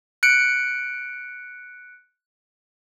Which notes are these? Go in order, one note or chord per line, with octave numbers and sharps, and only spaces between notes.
F#6 C#7 D7